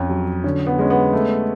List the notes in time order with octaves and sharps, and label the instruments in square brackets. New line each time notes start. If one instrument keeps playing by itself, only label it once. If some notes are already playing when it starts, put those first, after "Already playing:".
Already playing: [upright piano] F2 [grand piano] C#4
[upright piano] F#3
[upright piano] D3 [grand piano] C#4
[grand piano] B3
[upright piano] G#3 [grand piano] C#4
[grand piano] B3
[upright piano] A3